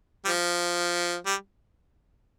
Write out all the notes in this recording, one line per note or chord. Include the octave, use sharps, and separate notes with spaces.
G3
F3
G3